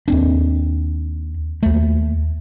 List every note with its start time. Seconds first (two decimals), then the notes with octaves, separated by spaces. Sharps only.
0.08 D#2 C4 D4
1.63 D#2 A3